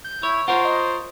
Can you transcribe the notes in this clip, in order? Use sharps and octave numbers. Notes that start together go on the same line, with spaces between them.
G6
E4 C#5
F4 A#4 C5 C#5 F#5
D#5